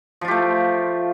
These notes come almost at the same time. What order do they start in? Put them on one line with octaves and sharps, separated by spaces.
F3 F4 G4 A3